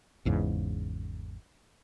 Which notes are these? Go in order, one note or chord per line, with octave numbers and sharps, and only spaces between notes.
G#1 E2 G#2 C#3